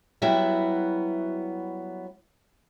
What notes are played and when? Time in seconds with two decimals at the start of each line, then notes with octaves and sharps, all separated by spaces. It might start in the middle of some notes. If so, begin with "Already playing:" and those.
0.22 F#3 G3 B3 E4 F#4 E5